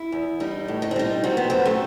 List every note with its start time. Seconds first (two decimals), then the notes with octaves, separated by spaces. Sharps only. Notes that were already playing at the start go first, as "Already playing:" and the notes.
Already playing: E4
0.12 E2
0.40 G3 D#4
0.68 A2
0.82 D#4
0.91 C4
0.96 G3 D#4
1.24 F#3 C4
1.37 B3
1.50 F#2 C4
1.65 A3